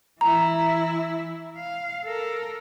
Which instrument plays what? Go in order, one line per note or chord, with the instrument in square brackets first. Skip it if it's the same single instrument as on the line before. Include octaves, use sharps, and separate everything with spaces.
[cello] E3 E4 [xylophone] A#5
[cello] F5
A4 A#4